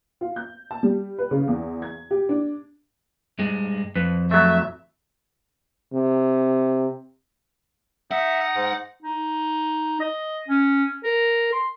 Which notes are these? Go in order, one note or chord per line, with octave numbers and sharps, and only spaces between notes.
F4
G6
A5
G3
B4
C#3
E2
G#6
G4
D4
G2 G#3
F2 B4
F#3 A3 E5
C3
D#4 E5 F#5
G#2
D#4
D#5
C#4
A#4
C6